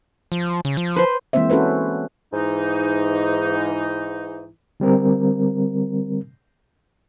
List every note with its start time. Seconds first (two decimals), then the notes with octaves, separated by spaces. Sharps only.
0.32 F3
0.65 C#3
0.77 F3
0.96 B4 C5
1.33 E3 G#3 A#3 C4 C5 E5
1.50 C#4 F#4 A4 B4 C5
2.33 G#2 E3 D#4
4.80 D3 G3 C4 A#4